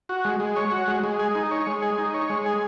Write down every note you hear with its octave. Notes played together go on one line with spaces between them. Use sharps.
F#4
G#3
G#3
C#5
F#4
G#3
G#3
G#4
D#4
C#5
G#3
G#4
D#4
C#5
G#3
G#4